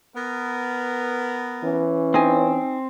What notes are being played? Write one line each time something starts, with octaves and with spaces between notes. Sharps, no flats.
B3 A#4
E3 C#4
C4 D#4 G#5